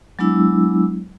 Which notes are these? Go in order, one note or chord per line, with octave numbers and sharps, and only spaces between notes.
F#3 G#3 B3 D4 E4 E6